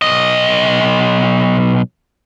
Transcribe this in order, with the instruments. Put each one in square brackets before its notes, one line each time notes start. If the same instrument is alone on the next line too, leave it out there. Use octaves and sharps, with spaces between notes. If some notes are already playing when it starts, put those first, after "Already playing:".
[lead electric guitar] B1 D#5